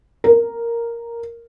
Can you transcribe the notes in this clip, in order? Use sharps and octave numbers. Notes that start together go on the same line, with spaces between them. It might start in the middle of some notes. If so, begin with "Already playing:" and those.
A#4